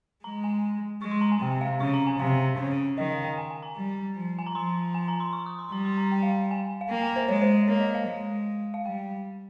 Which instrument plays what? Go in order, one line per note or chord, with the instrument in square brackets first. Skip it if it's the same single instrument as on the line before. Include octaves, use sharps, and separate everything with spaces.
[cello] G#3 [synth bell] A#5
[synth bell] G#5
[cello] G#3 [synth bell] C#6
[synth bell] C6
A#5
G#5
[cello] C3 [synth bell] G5
[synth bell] F5
[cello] C#3 [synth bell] C#6
[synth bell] A#5
G#5
[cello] C3 [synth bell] F5
[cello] C#3
[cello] D#3 [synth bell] D#5
[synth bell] F5
G5
G#5
G#5
A#5
[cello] G3
F3
[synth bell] G#5
A#5
[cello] F3 [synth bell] C6
[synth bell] G#5
A#5
C6
C#6
D#6
C6
[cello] G3 [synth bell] A#5
[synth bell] C6
A#5
G5
F5
G5
G#5
F5
[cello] A#3 [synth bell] G5
[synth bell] G#5
C5
[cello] G#3 [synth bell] C#5
[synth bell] C5
[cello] A#3 [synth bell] C#5
[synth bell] D#5
F5
[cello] G#3
[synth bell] F5
[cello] G3 [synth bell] G5